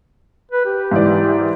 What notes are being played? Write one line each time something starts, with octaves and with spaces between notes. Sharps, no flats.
B4
G4
G#2 E3 D5